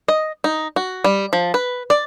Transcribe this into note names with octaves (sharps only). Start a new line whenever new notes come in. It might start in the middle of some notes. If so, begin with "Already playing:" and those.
D#5
D#4
F#4
G3
F3
B4
D5